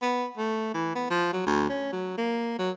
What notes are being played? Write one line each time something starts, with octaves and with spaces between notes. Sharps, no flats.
B3
A3
E3
B3
F3
F#3
D2
C#4
F#3
A#3
F#3